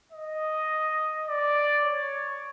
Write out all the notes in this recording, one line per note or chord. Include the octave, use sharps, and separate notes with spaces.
D#5
D5
C#5